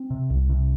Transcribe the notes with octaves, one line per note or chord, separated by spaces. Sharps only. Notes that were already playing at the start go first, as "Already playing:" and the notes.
Already playing: C4
C3
C2
C3